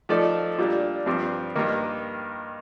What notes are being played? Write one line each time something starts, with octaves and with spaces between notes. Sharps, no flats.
F3 A3 D#4 A4 D5
A#2 G3 D4
G2 F3 C4
G2 D#3 A#3